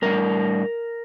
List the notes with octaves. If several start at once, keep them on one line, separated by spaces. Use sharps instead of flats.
A2 G3 D4 A#4